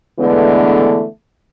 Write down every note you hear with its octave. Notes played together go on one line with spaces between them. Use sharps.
D3 E3 G#3 A3 B3 D4